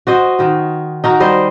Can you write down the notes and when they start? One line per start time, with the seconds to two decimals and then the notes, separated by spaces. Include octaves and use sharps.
0.07 F#4 C5 D#5
0.39 D#3 F#4
1.04 D#4 F#4 A#4
1.20 G3 C5 D#5